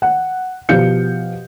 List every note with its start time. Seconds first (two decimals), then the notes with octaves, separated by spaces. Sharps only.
0.02 F#5
0.69 B2 F3 G4 F5 G6 C#7